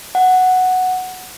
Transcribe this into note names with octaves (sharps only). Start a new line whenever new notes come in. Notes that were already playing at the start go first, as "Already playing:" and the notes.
F#5